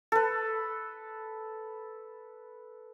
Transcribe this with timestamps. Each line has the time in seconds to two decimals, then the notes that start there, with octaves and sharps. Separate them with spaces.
0.12 A4 B4